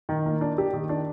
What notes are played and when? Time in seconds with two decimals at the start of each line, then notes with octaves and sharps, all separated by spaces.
0.09 D#3
0.26 A#3
0.41 D4
0.58 G4
0.73 D#3
0.89 D4